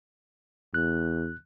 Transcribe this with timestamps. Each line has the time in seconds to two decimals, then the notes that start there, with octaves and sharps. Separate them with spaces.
0.74 E2 F#6